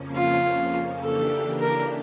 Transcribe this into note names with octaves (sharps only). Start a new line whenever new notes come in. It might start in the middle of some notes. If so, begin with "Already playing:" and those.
Already playing: F2 C#3 F3 A#3 C#4
F4
C#3 E3 A#3 D4 G4 A4
A#4